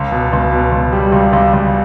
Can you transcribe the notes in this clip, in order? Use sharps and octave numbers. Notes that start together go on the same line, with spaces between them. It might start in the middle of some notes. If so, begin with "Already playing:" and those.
Already playing: C#2
B2
C#2
B2
C#2
G3
C#2
C#2
C#2